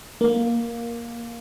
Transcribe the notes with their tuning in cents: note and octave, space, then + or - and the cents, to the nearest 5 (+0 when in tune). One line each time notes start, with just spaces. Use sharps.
A#3 +10